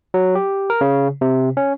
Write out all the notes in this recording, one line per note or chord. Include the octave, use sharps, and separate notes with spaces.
F#3
G4
A#4
C#3
C3
C#4